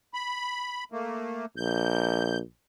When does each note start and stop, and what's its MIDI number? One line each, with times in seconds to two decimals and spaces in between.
0.14 0.84 83
0.92 1.46 57
0.92 1.46 58
1.57 2.41 34
1.57 2.39 91